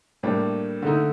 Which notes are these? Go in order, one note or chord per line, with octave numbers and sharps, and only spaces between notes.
A2 G3 A#3 D4
D3 A3 D#4